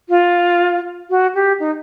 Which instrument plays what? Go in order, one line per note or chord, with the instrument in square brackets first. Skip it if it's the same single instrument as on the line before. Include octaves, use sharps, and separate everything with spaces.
[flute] F4
F#4
G4
D#4